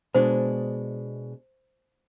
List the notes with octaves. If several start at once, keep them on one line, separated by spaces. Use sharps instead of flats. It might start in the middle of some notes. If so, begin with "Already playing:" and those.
B2 G#3 D4 C5